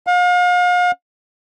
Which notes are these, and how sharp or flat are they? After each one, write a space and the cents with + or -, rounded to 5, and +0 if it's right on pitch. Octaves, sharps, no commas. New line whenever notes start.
F5 +40